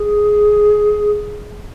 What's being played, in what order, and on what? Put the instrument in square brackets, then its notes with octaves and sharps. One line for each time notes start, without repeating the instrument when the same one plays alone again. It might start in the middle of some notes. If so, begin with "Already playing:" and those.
Already playing: [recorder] G#4